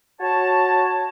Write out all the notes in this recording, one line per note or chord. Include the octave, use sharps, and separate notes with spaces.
F#4 C#5 A5